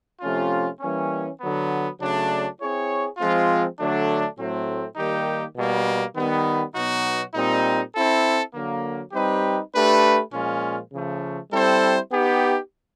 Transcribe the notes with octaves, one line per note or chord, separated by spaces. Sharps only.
C3 F3 A3 C#4 F4
E3 G3 A#3 C#4
D3 F#3 B3
C#3 F#3 A3 D4
C4 E4 G#4 C#5
F3 G#3 C4 F4
D3 F#3 A3 D4
A2 F#3 A3 C4
D#3 G3 A#3 D#4 G4
B2 G3 A#3
D#3 G3 B3
B2 F#3 B3 D#4 F#4
A#2 G3 C4 D#4
C4 E4 A4
D3 F#3 A#3
G3 C4 D#4 G4 B4
A3 D4 G4 B4
A#2 F3 G#3 C#4 F4
C#3 F3 A3
G3 C4 E4 A4 C5
B3 D#4 G4